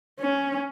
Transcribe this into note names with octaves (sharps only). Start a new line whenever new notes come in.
C#4